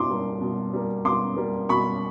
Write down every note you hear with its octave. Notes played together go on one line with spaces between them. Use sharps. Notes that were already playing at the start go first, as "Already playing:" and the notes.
Already playing: B2 C6 D6
G3 A#3
B2
G3 A#3
B2 C6 D6
G3 A#3
B2 B5 C#6